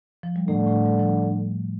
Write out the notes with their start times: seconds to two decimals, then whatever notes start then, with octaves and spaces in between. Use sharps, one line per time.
0.23 F3
0.36 G3
0.48 A2 D3 A3
0.67 A2 A3
0.86 G3
1.00 F3